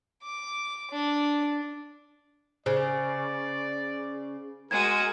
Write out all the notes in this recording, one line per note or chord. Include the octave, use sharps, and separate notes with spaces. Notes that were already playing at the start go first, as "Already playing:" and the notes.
D6
D4
C#3 C5 D5
G#3 F#4 A#4 G#6